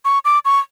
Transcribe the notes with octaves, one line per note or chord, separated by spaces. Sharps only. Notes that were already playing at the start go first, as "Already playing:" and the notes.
C#6
D6
C#6